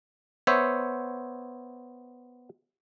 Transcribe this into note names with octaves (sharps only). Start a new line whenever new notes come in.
B3 C5 C#5 E5